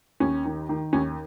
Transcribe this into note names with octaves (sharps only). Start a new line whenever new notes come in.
D#2 C#4
D#3
D#3
D#2 C#4